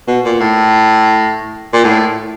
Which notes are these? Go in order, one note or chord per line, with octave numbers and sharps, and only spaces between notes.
B2
A#2
A2
A#2
A2